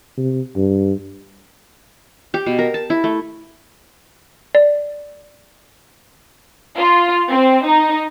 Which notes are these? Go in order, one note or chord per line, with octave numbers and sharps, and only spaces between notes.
C3
G2
G4
B2
A#4
A5
E4
A3
D5
F4
C4
D#4